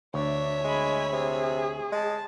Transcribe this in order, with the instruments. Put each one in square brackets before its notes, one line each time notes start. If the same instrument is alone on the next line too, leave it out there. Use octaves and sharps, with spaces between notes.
[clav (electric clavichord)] D2 [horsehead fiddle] D4 [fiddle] C#5 E5
[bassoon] G#3 [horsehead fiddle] G#5 B5
[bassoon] C3 [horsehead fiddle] G#4
[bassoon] G#3 [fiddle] A5